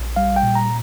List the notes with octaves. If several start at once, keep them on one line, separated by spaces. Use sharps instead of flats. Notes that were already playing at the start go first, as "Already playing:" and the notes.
Already playing: A#1
G3 F5
G5
A#2
A#5